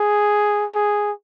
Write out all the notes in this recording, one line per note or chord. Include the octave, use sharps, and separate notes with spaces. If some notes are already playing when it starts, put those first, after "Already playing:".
Already playing: G#4
G#4